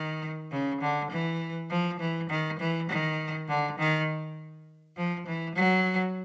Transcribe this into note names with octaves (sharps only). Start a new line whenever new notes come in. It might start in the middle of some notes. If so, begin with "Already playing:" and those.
Already playing: D#3
C#3
D3
E3
F3
E3
D#3
E3
D#3
D3
D#3
F3
E3
F#3